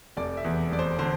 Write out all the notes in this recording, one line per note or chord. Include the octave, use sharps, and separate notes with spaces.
F1 D5
E5
E2
F1 D5
C5
D3 C5